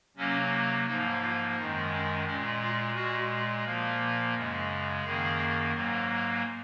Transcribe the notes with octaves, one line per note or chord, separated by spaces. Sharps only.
C3 F#3 A#3 C#4
G#2 F3 A#3 D#4
F4
F#2 D#3 G#3 D#4
C#4
A#2 G#3 C#4
F4
A#2 G#3 F#4
A#2 F3 A#3
F#2 C#3 G#3
F#2 D#3 A#3 G#4
G#2 F#3 A#3